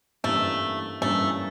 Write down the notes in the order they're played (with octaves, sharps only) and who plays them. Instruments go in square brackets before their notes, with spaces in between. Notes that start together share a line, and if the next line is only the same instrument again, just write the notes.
[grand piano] G2 E3 G3 A#3 C#4 [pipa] A3
[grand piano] G2 E3 G3 A#3 C#4 [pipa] A3